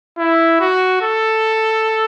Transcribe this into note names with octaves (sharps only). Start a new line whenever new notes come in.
E4
F#4
A4